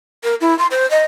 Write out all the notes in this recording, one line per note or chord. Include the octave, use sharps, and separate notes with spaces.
A#4
E4
C6
C5
D#5